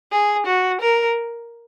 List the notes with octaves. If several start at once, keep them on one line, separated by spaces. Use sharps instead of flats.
G#4
F#4
A#4